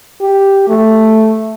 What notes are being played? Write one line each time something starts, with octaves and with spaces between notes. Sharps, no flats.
G4
A3